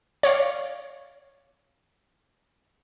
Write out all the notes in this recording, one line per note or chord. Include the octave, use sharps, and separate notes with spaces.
C#5 D5 F5